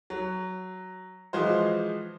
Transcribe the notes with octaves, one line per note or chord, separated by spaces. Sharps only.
F#3
E3 F3 G#3 F4 F#4 C5